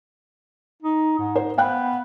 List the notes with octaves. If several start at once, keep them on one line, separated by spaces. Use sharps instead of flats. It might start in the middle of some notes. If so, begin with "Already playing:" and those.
D#4
G#2
C5
B3 F5 G5 F#6